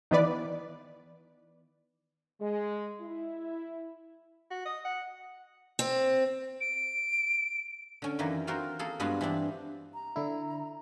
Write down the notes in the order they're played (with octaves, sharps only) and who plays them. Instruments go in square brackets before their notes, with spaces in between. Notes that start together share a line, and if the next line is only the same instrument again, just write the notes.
[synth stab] D#3 E3 B3 B4 D5
[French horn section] G#3
E4
[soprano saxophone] F#4
D#5
F#5
[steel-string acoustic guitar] C4
[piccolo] D7
[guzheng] D3 C#4
F#2 D#3 E3 A#3
C4 F4 F#4 A#4 C5
A#3 G#4 A4
G2 G#3 B3 F4 F#4
E3 C4 D4
[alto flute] A#5
[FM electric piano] D3 E4